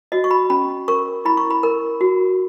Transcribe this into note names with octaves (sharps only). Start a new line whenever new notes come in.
F#4 D#5
C#6
B5
C#4 B5
A#4 C#6
E4 B5
C#6
B5
A#4
F#4